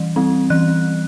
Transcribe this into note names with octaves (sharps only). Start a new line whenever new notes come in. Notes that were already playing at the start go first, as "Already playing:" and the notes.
Already playing: E3 G3
G3 C4
E3 F#6